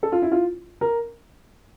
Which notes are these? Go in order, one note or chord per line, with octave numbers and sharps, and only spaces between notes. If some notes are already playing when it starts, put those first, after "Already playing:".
A4
F4
E4
F4
A#4